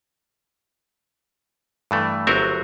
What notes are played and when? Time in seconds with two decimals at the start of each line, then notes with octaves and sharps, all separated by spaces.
1.91 G2 E3 A3
2.27 G1 F#3 C4 F#4 A#4 E5